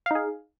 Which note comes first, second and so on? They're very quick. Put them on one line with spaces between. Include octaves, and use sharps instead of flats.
F5 D#4 G#4